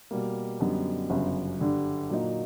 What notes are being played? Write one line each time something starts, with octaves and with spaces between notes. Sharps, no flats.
B2 G3 A#3
F#2 D3 G3 B3 D#4
G1 F#2 C#3
G2 D3 G3
A#2 F#3 A#3 D#4